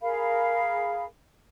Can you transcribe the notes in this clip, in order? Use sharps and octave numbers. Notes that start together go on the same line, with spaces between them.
G#4 A#4 F5 B5